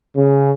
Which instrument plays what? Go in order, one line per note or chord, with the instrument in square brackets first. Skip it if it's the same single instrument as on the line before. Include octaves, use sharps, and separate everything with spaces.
[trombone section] C#3